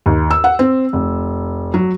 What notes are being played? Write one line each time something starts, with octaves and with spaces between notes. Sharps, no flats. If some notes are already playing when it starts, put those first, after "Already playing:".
D#2
E6
F#5
C4
F1
F#3